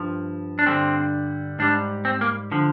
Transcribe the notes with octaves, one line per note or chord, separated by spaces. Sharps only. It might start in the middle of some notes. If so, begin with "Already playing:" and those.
Already playing: G2 F3
D4
G2 D3 G3 C4
G#2 G3 D4
C4
A#3
D3 F3